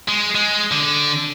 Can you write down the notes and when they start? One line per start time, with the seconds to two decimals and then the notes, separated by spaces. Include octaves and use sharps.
0.09 G#3
0.35 G#3
0.72 D3